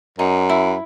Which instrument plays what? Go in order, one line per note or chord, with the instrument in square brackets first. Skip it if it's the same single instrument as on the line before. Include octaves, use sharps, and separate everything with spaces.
[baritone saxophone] F#2 [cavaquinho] D#4
[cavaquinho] E4